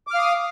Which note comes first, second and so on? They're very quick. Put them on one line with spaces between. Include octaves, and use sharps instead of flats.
D6 F6 F5 D#6